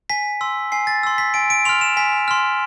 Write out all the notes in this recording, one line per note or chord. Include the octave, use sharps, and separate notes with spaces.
G#5 B6
C6 E6
G#5 C7
A6
C6 E6
B6
G#5 D7
D7
C6 F6 F7
E7
G#5 B6
C6 F6